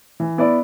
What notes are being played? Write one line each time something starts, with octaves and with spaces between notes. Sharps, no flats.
E3
B3 E4 B4 D5